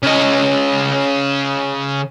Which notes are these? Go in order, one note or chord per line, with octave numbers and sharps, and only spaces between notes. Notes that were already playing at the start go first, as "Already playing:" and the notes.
C#3 D#5